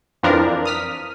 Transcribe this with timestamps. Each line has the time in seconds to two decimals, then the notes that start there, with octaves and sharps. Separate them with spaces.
0.23 F2 E3 F3 D4 A#4
0.65 D#6 F6 B6